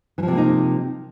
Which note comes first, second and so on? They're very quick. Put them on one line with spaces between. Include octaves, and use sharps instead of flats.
E3 F3 C3 A#3 D#4